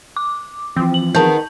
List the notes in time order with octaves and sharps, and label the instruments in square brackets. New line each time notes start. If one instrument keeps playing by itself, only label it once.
[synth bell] D6
[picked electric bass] E3 F3 [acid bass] C4
[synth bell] F#7
[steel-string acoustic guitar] D#3 B3 G#4 [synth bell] A5 G6